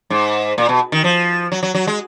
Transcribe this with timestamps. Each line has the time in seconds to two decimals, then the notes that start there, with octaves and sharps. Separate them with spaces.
0.10 G#2
0.58 A#2
0.69 B2
0.92 D#3
1.04 F3
1.52 F#3
1.63 F#3
1.75 F#3
1.87 G#3